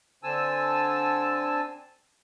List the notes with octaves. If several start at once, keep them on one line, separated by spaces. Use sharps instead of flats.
D3 C4 G#5 A5 E6